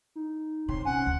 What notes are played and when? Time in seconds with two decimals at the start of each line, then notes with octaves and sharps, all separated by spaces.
0.15 D#4
0.68 C3 G4 C#5 C6
0.85 C#4 F#5 G#5 A5
1.06 D2